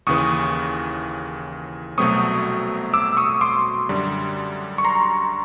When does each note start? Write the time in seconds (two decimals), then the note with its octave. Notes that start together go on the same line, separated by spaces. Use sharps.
0.07 D#2 C#3 E3 C#6 D#6
1.98 C2 B2 F#3 A3 C4 C#6 D#6
2.94 D6 E6
3.17 C#6 D#6
3.41 C6 D6
3.89 F#2 D3 G3
4.78 C#6
4.85 A#5 C6